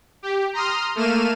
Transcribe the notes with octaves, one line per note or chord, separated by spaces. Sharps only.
G4
A#5 C6 D#6 F6
A3 A#3 F6 D#7 E7